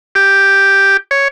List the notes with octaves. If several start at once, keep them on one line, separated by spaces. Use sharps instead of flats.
G4
C#5